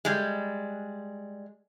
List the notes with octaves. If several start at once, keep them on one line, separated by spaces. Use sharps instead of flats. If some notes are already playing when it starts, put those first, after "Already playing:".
G3 G#3